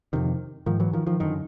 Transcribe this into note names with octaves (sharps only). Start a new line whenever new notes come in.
F2 C3 D#3
G#2 D#3 F3
E3 F#3
D#3 F3
D#3 F3
F#2 D3 D#3